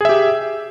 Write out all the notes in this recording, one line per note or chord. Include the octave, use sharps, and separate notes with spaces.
G4 G#4 E5